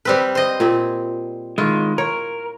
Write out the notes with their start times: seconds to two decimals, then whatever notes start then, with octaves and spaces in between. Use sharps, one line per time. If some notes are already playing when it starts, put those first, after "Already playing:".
0.05 G3 C4 B4
0.35 C5 D#5
0.60 A#2 C4 G4
1.58 D#3 G#3 E4 F4
1.98 A#4 C#5